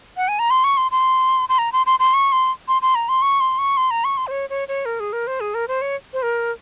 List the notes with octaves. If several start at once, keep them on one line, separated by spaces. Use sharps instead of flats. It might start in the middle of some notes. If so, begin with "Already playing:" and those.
F#5
G#5
A#5
C6
C#6
C6
C6
C6
A#5
C6
C6
C6
C#6
C6
C6
C6
A#5
C6
C#6
C6
C#6
C6
A#5
C#6
C6
C5
C#5
C#5
C#5
A#4
G#4
A#4
C5
G#4
A#4
C5
C#5
C5
A#4